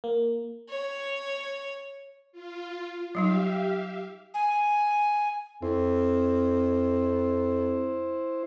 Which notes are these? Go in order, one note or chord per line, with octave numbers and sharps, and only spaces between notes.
A#3
C#5
F4
F#3 G3 D#4 G4 E5 F5
G#5
F2 E4 C5